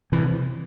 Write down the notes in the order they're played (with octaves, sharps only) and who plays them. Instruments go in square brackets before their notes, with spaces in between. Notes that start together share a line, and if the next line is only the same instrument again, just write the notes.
[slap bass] C3 E3